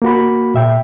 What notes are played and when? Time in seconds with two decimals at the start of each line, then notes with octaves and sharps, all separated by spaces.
0.02 A#3 F#4 B5
0.55 A#2 E5 G5